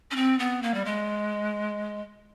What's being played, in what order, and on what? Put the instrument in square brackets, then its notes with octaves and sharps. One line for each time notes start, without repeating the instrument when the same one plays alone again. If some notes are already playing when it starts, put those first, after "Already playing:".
[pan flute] C#4
C4
B3
A#3
G3
G#3